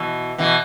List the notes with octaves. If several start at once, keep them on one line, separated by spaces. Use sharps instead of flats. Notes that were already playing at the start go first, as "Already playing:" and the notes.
Already playing: B2 E3
B2 E3